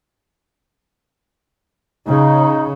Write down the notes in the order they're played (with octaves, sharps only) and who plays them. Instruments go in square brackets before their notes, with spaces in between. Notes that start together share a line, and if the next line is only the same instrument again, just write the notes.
[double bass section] C#3 [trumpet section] D#4